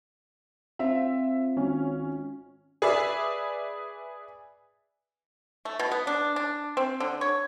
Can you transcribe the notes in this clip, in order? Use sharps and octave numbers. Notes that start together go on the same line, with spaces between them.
C4 F4 E5
G#1 C#4
G#4 B4 D5 E5
A3
B2
B3
D4
D4
C4
D3
C#5